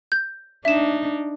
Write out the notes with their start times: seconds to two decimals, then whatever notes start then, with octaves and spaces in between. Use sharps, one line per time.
0.12 G6
0.65 D4 D#4 E5 E7